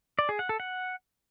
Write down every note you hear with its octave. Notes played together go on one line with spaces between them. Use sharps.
D5
G#4
F#5
A4
F#5